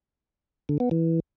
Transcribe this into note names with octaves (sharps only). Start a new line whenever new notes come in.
D3
B3
E3